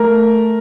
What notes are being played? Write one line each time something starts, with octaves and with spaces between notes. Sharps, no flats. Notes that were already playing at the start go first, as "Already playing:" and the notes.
Already playing: A3 A#4